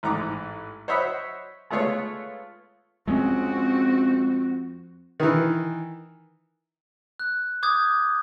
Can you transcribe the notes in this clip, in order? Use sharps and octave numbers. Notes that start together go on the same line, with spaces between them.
A1 G#2 A#5 D6
C5 C#5 D#5 E5 F#5 B5
G#3 A3 B3 F4 C#5 F5
F2 G#3 C4 C#4 F#4
D#3 E3
F#6
D6 D#6 G6 G#6